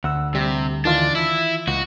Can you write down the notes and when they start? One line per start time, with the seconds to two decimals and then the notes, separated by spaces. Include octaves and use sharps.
0.04 D2 F#5 E6
0.35 C3 G3
0.85 D#3 E3 D4 F4
1.15 E4
1.68 C#2 F#4